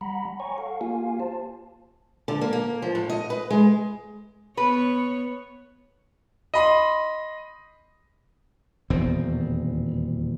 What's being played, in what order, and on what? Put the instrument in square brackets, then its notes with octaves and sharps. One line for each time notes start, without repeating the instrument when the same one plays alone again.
[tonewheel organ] G3 F#5 A#5 B5
C#5 G5 G#5 A#5 C#6
A4 F5 F#5
A#3 F4 G4 F5 G#5
C5 A5
[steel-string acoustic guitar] D3
A#3
A#3
F3
A2
D#5
B4
G#3
[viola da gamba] B3 C#5 [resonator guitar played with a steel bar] B4
[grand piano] D#5 B5 C6
[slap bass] D#1 E2 B2 C4